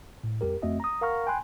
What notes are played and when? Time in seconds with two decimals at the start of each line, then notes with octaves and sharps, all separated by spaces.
0.24 A2
0.41 F2 G3 G4 A#4
0.62 F2 A3 C4 F#4 D#5 E5
0.80 A#5 D#6
1.01 A#4 F5 F#5 A#5 C#6 F6
1.27 G5 G#5 B5 C6 F#6